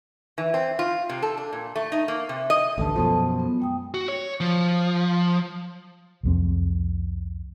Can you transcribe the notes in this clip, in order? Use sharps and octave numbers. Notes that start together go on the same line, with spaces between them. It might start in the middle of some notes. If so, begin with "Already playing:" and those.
E3
C4
F4
C3
A4
D4
A#2
A3
D#4
A#3
C3
D#5
A1 D2 G2 A4 A5
F#2 B2 F3
B3
G#3 G5 D#6
F#4
C#5
F3
C2 F2 C4